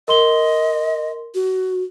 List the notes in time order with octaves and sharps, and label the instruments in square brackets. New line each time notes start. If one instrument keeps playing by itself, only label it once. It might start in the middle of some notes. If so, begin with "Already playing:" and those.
[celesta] A#4 C6 G7 [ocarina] D#5
[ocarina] F#4